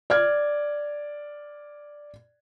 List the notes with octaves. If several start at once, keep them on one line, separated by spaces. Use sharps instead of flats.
D5 F6 G#6